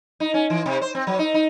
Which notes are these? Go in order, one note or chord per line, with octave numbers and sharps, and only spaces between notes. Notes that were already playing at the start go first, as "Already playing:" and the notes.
D#4
C#4
E3
C3
C5
C4
F#3
D#4
D#4